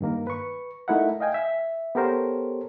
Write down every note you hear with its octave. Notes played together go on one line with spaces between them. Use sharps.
G2 D#3 A#3 A#4
B4 C#6
A3 D#4 E4 A#4 E5 F#5
D#5 F5 G5 G#5
E5
B3 G4 A4 A#4 C5 C#5